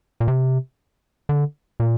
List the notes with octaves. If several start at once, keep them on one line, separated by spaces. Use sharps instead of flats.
A#2
C3
D3
A#2